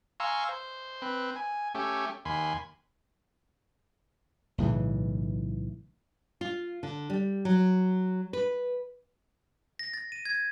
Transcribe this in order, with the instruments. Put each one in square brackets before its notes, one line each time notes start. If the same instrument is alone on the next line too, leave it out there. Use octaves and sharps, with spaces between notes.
[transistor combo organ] F5 G#5 A#5 C6 C#6 E6
C5
C4 B4
G#5
A3 C#4 G4
D#2 G#5 B5 C6
[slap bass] B1 A2 C#3 E3
[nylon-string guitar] F4
D3
G3
F#3
B4
[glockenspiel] A#6
A6
D#7
G#6